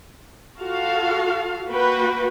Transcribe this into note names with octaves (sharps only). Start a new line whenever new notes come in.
F4 F#4 A4 F5
A#3 F#4 B4 G5